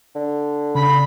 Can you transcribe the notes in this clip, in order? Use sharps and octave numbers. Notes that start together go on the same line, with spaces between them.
D3
C#3 B5